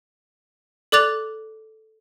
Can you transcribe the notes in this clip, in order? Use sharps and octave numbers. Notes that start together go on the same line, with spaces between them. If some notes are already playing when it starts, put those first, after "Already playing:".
A4 D5 D6 F#6 A6 F7